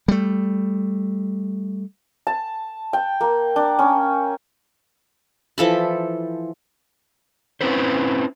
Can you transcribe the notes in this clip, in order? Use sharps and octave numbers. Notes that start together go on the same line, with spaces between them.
G3 A3
A5
G5
A#3
D4
C#4
E3 F3 A4 B5
C4 C#4 E4 B4 C5